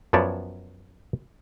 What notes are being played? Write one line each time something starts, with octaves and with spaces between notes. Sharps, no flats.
F#2 F3 B3 C#5 D5 A5